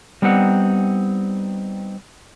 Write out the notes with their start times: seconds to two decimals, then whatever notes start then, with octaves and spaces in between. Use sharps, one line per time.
0.22 G3 B3 C4 D#4 F#5